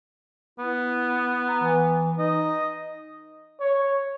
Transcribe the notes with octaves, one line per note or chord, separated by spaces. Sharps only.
B3 E4
A#5
E3
D#4 D#5
C#5